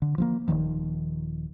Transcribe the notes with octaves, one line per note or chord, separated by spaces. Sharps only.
D3
F3 A3 A#3
D#1 C#2 D#3 F3